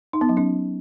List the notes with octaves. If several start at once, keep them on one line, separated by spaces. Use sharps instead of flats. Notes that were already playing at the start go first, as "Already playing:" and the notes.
D#4
B3
F#3
C#4